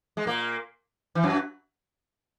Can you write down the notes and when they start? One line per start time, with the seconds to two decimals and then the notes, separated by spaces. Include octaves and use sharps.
0.17 G#3
0.27 A#2 A#3
1.15 E3
1.24 F#2 F#3